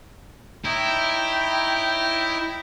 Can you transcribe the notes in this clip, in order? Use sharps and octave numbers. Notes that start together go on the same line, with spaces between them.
D#4 E4 C#5 G5 A#5